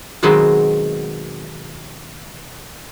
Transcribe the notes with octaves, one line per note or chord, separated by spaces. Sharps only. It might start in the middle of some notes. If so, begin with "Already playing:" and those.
B2 D#3 F#3 G#3 C4 D#5